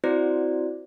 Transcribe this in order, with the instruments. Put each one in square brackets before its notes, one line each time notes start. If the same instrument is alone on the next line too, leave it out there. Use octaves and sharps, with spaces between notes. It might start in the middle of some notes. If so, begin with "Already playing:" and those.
[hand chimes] C4 E4 F#4 C5 D5